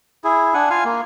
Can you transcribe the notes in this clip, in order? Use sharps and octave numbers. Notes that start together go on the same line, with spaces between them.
E4 G#4
D4 F#5 G#5
F4 F5 G#5
A#3